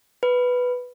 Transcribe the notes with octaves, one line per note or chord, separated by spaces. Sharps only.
B4